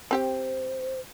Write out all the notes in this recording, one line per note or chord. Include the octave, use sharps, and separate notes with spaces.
C4 G4 C5 G5